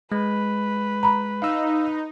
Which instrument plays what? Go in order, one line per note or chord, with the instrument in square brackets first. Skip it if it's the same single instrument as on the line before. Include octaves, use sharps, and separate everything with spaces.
[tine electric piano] G#3 [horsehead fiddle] B4
[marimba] A#5 B5
[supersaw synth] D#4 [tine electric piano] F5 E6